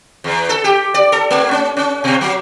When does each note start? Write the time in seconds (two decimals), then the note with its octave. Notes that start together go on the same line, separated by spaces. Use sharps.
0.24 E2
0.49 A4
0.64 G4
0.94 D5
1.12 A4
1.31 A3
1.51 C#4
1.77 C#4
2.04 B2
2.21 F#3